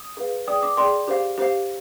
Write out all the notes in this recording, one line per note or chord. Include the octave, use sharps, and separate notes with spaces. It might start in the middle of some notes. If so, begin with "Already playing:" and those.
Already playing: D#6
G#4 B4 F5
G#4 D5 G5 D#6
D6
G#4 D5 G5 C6
G4 C5 F5
G4 C5 F5